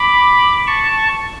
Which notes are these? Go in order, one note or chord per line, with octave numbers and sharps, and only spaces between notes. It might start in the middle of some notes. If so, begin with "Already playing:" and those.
Already playing: B5 D6
A5 C#6